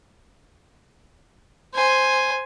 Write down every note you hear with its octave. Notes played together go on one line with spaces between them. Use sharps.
C5 G#5